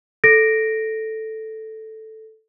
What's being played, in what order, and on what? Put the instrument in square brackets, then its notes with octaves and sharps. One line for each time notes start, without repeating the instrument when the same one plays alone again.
[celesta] A4 A#6 D7